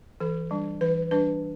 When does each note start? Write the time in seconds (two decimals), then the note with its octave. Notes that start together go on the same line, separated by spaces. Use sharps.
0.20 E3 A4
0.51 G3 D4
0.81 E3 B4
1.11 G3 D4 B4